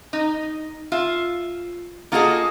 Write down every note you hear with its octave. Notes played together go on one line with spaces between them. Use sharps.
D#4
F4 E5
A#3 F4 F#4 G#4 A4 D#5